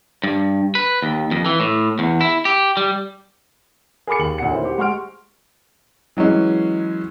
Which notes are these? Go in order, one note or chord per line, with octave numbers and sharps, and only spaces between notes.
G2
B4
D#2
F2
E3
A2
E2
E4
G4
G3
G#4 A#4 B5 D6 C#7
D#2 F#7
D2 A#2 F#5 C#7
C4 C#4 D#4 E4 A#4 C#5
F#4 G4 C5
G#3 F#5 C6 C#6 F6 D7
E3 F#3 G#3 C#4